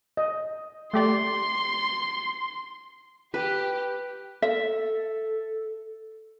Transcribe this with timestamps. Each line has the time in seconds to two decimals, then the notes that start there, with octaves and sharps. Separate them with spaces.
0.17 D#5
0.94 A3 G4 D5 C6
3.34 G4 B4
4.42 A4 E5